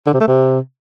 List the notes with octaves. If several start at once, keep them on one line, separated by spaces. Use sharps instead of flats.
D3
C3
A3
C3